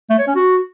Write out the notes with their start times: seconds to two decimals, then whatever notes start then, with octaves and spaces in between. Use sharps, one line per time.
0.10 A3
0.18 C#5
0.27 C#4
0.36 F#4